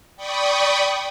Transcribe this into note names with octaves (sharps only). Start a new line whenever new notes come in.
D5 G5 B5 C#6 D#6